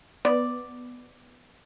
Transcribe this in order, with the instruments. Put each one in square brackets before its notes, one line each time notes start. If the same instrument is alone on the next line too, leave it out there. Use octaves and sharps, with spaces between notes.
[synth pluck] B3 [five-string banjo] D5